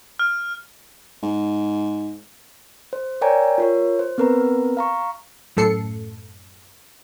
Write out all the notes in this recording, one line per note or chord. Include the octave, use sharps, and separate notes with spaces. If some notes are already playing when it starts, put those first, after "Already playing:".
F6
G#2
C5
A#4 C#5 D5 G5 G#5 A#5
F4 A#4 C#5
C5
B3 C4 A#4 B4 A#5
F5 A#5 C#6
F#2 A2 A4 C7 C#7